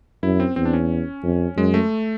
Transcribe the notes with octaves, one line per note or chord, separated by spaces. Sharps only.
F#2 E4
C4
E2 C4
D4
C#4
F2
F#2 G#3
A3